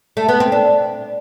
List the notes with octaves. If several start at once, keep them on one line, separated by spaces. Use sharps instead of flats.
A3
B3
C4
D4